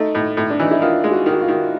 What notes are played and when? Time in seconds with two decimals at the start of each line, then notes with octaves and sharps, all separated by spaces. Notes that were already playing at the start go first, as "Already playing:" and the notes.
Already playing: A3 D#4
0.15 A2
0.37 A2
0.50 D4
0.59 E3 D#4
0.71 E4
0.82 D#3 F4
1.04 G#3
1.11 F#4
1.26 D#3
1.33 F#4
1.41 F4
1.48 D#3